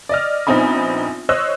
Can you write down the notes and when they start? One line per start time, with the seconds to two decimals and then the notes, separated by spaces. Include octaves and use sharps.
0.09 D5 D#5 F6
0.47 A#1 B3 C4 D#4 G#5 B5
1.29 C5 C#5 D#5 E6 F#6